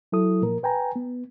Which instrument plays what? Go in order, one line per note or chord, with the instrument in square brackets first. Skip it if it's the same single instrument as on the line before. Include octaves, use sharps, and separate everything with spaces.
[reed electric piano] F#3 E4 A4 D#6
A#2 F3 A#4
B4 G5 G#5 A#5
B3